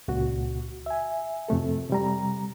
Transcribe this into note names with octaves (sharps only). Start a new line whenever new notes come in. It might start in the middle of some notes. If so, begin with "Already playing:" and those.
C#2 A#2 F#4
E5 G#5
F2 C3 A3 A4
C3 G3 A#5